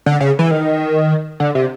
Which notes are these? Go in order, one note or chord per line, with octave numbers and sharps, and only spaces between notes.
D3
C#3
E3
D#3
D3
C3